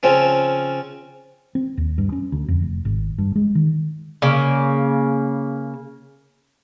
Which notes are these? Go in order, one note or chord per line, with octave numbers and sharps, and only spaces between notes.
C#3 F3 C4 C#4
C4
D#2
G2
C#4
D2
F2
F1
G#1
G2
G#3
D#3
C#3 A#3